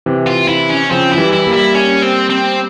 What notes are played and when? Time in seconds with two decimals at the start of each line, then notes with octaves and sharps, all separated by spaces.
0.06 C3 E3
0.27 F4
0.48 E4
0.69 C#4
0.90 C#3 F3 C4
1.11 E4
1.18 E3 G3
1.32 E4
1.47 G3 A#3
1.53 E4
1.74 C#4
2.02 C4
2.30 C4